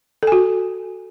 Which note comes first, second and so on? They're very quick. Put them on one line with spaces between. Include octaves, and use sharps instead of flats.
A4 G#5 F#4